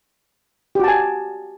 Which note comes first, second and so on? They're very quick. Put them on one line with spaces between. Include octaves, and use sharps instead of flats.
G4 F#4 A5 G#5